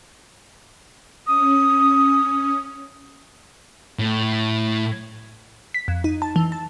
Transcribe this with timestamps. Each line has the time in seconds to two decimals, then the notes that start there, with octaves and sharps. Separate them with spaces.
1.27 C#4 D#6
3.99 A2
5.74 B6
5.88 F2
6.04 D#4
6.22 A5
6.36 E3
6.52 A5